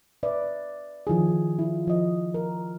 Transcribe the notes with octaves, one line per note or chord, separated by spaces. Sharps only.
B4 D5 E5
D#3 F3 E4 G#4
E4 F4
F3 D#5
A#4